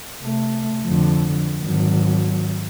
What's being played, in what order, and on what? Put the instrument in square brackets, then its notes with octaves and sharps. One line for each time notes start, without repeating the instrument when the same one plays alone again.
[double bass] C3 A3
F2 D3
G#1 F#3